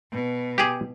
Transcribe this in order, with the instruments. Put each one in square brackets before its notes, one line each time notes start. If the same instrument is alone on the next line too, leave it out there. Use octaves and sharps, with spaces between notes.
[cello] B2
[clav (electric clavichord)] G4 G#4